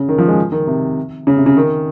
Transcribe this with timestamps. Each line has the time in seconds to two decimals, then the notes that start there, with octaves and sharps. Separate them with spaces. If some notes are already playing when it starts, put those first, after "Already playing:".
Already playing: C#3
0.09 D#3
0.18 F3
0.28 G#3
0.52 D#3
0.67 C3
1.27 C#3
1.37 C3
1.46 C#3
1.57 D#3